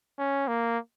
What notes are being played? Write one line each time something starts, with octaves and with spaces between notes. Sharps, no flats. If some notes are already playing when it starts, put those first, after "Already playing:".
C#4
A#3